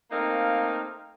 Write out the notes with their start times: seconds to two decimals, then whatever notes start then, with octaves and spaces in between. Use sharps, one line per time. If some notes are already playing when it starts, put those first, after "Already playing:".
0.11 A3 A#3 C4 D#4 A#4 F5